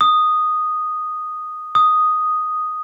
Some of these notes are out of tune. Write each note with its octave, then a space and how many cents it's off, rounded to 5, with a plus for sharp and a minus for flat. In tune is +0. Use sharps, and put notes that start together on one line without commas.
D#6 -5
D#6 +0